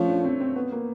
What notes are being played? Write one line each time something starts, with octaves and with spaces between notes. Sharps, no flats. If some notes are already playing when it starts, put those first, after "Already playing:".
Already playing: F3 A3 C#4
D4
C4
C4
B3
A#3